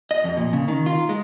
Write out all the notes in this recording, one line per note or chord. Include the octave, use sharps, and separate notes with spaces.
D#5
F2
A#2
C#3
D#3
F4
G#3